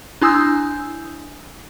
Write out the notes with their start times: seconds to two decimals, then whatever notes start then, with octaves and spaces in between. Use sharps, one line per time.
0.21 D4 E4 G#5 D#6 E6 G6